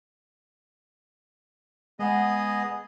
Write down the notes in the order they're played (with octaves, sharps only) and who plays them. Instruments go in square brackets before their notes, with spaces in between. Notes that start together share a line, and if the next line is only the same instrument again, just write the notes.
[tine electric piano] G#3 F#5 [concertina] B3 G#4 D#5